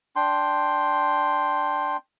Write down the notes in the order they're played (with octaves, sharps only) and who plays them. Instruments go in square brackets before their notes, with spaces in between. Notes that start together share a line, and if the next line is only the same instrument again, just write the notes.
[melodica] D4 G5 C6